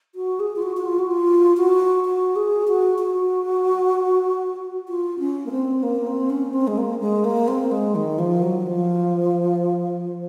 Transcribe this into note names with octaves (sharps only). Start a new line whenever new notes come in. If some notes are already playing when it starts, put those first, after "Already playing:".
F#4
G#4
F4
F#4
F#4
F4
F#4
F4
F#4
F#4
G#4
F#4
F#4
F4
C#4
A#3
C4
A#3
C4
C#4
C4
G#3
A#3
G#3
A#3
C4
G#3
D#3
F3
F#3
F3